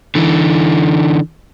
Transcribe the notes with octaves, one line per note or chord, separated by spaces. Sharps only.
D3 E3